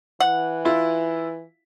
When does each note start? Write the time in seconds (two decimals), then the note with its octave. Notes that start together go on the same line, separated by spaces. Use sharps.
0.20 E3 F#5
0.65 E4 F4